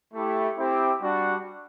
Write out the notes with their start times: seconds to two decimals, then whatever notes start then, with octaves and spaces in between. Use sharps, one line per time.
0.13 A3 E4 G4
0.57 C4 E4 G4
1.01 G3 D4 F#4